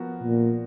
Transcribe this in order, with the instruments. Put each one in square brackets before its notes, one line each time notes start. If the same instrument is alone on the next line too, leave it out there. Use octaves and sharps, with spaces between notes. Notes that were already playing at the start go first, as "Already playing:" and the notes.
Already playing: [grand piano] F3 B3 F#4 A#4
[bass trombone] A#2